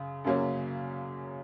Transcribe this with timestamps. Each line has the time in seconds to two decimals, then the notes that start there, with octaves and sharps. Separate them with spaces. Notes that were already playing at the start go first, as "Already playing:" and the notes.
Already playing: F#2 C#3
0.24 F#2 C#3 F#3 A#3 C#4